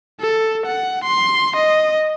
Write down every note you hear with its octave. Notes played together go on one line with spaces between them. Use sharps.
A4
F#5
C6
D#5